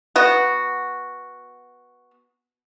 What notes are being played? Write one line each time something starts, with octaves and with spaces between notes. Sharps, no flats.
B3 F#4